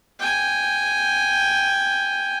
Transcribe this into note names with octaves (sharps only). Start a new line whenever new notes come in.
G5 G#5